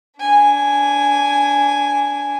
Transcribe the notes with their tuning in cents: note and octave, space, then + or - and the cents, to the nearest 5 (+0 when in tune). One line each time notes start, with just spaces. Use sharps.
D4 -25 G#5 +0